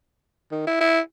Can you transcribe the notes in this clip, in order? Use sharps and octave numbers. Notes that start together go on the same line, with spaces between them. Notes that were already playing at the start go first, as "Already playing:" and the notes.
D#3
E4
E4